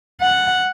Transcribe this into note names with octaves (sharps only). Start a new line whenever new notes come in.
F#5